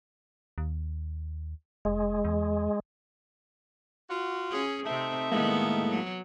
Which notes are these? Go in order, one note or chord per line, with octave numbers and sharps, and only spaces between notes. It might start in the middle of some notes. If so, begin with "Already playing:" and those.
D#2
F1 G#3
E2
F4 F#4
C#4 G#4
C3 A3 C4 D#4 E5
A2 D#3 G#3 A#3 B3
F#3